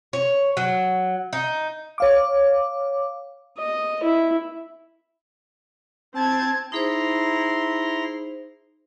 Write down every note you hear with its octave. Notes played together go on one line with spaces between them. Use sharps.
C#5
F#3
D#4
C#5 F5 D6
D#5
E4
C4 A5 G#6
D#4 E4 G#4 C5 A#5 C6